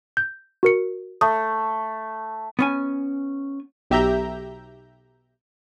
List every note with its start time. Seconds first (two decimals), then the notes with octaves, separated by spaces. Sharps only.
0.17 G6
0.63 F#4 A#4 C#7
1.21 A3 D#6
2.59 B3 C#4 G#5
3.90 B1 G4 E5 A#5 G6